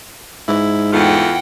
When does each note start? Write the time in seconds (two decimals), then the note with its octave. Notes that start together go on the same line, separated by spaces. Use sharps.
0.48 G#2 E4
0.93 E2 A3 F4 F#5 G5